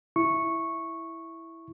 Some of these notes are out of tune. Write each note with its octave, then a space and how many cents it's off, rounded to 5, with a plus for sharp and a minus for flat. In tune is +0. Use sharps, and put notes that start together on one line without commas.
E4 +0 C#6 -10